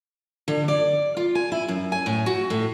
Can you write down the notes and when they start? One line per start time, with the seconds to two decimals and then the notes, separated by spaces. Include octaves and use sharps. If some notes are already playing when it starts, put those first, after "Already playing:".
0.48 D3
0.68 D5
1.17 F4
1.35 G#5
1.52 E4
1.68 F#2
1.92 G#5
2.06 A2
2.26 F#4
2.50 A2